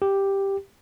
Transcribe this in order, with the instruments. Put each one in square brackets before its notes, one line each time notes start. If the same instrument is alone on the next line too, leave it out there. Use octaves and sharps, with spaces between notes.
[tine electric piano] G4